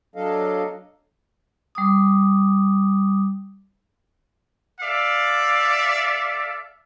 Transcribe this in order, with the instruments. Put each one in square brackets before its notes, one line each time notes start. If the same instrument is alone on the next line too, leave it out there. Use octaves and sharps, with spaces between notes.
[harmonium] F#3 D4 A4 D#5 F5
[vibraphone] G3 D6 D#6
[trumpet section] A4 D5 E5 F5